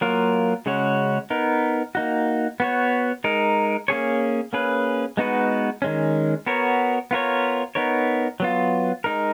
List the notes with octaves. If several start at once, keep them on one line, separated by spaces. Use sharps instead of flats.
F#3 A#3 F4 A#4
C#3 G#3 C#4 F#4 C#5
B3 D#4 A#4
A#3 D#4 F#4
B3 F#4 C#5
G#3 D#4 A#4
A#3 C#4 G#4 C#5
A#3 C#4 G#4 B4
G#3 B3 D#4 F#4 B4
D#3 G#3 C#4
B3 F#4 A#4 C#5
B3 F4 A#4 C#5
B3 D#4 A#4 C#5
F#3 B3 F4
G#3 D#4 A#4